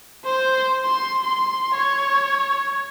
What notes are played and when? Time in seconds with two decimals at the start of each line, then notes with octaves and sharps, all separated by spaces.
0.25 C5
0.85 C6
1.24 C6
1.75 C#5